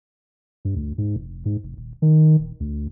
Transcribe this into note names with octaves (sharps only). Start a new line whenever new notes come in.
G2
D2
G#2
F1
G#2
F1
D#1
D#3
D#1
D2